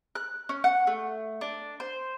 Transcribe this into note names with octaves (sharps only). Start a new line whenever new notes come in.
F#6
C#4
F#5
A3
D4
C5